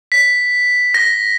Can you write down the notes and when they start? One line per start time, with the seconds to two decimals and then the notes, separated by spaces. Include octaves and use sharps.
0.12 B6
0.94 A#6